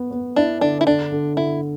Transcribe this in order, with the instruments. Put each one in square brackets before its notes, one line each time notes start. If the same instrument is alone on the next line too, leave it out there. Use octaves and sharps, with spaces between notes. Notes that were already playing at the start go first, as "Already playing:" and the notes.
Already playing: [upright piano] B3
B3
[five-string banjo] D4 [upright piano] E4
[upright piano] D3 [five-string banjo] D4
[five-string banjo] E4
[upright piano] D3 [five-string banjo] D4
[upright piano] D3
[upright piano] D3 [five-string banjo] E4